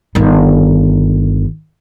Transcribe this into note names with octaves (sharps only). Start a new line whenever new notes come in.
G1 D#3